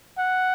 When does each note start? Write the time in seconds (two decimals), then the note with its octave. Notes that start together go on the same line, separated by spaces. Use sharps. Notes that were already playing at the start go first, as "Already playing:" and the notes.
0.18 F#5